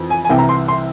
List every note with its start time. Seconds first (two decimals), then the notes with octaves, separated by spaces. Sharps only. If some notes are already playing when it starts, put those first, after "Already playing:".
Already playing: F2 E3
0.10 G#5
0.25 G#5
0.30 C2 C3 E3 G5
0.39 A#5
0.49 C6
0.68 C6